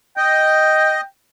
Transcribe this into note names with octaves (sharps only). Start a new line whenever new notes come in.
D#5 G5